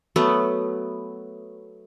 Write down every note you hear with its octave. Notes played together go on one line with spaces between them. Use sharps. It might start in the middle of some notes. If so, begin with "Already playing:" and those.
F#3 A3 B3